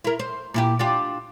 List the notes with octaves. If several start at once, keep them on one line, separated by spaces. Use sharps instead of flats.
E4 A#4
C5
A#2 E4 G4
D4 F4 G4